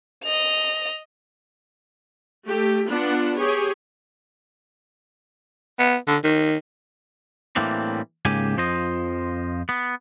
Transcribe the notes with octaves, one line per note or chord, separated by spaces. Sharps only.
D#5 F7
A3 G4
B3 D4 F4 F#5
G4 G#4 C#5
B3
D3
D#3
A2 E3 G3 A#3 C4 D4
C#2 G#2 C#3 A#3 G4 G#5
F2 F3 C5 D#5
B3